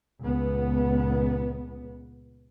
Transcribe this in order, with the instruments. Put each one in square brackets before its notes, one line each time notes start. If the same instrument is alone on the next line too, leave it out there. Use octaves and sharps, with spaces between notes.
[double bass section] C#2 A#2 B3